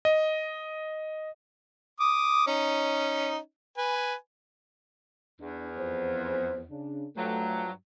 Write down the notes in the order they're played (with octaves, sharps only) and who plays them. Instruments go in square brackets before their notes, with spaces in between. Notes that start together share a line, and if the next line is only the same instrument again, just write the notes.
[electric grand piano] D#5
[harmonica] D6 D#6
C#4 D#4
B4 G#5
[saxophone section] E2 [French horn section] D4
[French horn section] F2 C5
C#3 D4
[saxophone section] G2 F3 F#3 [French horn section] A3